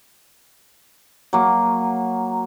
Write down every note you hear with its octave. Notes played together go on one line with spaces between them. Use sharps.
F#3 A#3